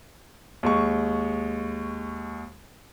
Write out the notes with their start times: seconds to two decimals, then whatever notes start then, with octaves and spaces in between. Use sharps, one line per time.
0.63 D#2 G#3 C#6